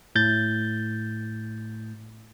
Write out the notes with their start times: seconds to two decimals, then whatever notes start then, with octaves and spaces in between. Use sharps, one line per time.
0.15 A2 G6 A6